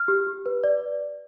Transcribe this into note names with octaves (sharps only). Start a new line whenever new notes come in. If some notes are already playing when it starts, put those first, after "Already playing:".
Already playing: F6
G4
G4
B4
D5